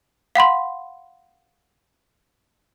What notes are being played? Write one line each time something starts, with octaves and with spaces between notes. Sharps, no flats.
F5 F#5 B5 C6